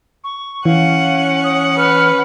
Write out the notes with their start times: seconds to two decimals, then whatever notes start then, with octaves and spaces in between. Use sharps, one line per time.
0.24 C#6
0.65 E3 C#4 F5 F#5
1.44 D#6
1.78 B4 F6